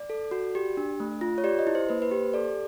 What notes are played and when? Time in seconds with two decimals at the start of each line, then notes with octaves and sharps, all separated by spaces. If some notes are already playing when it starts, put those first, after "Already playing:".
Already playing: D5
0.10 A4
0.31 F#4
0.55 G4
0.77 D4
1.00 A3
1.21 F4
1.38 C#5
1.44 G4 D5
1.59 D#5
1.67 E4
1.75 C5
1.89 A#3 B4
2.02 B4
2.11 G4 C5
2.34 A4 D5